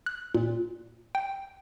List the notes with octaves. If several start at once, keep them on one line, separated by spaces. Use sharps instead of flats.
F#6
A#2
G5